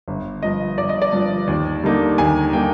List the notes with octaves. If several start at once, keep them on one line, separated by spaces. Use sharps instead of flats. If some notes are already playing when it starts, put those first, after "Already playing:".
G1
G2 F3 D#5
G1 D5
D#5
D5
G2 F3
D#2
D3 G3 A#3 D#4
D#2 G#5
D3 G3 A#3 D#4 G5